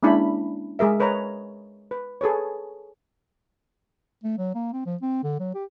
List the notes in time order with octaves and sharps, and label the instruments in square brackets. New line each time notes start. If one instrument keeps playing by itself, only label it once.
[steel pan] G#3 A#3 C#4 D4 E4 B5
G#3 G#4 A#4 E5
A#4 B4 C#5 D#5 A#5
B4
G#4 A4 B4 C#5
[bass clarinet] A3
F#3
A#3
C4
F3
C4
D3
F#3
G4